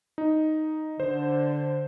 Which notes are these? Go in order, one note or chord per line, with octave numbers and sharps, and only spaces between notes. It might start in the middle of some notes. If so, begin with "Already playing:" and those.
D#4
D3 C5